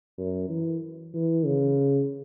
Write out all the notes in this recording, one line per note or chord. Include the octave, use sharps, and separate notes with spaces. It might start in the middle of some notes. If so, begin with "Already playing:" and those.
F#2
E3
E3
C#3